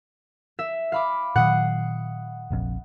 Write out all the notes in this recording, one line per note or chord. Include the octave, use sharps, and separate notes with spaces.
E5
F5 B5 D6
A#2 D#3 F#3 F#5 D#6 C7
F1 A#1 F2